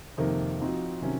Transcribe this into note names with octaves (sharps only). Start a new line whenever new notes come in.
F2 C3 D#3 A#3
F3 C4 D#4 F#4
C3 D#3 F#3 C#4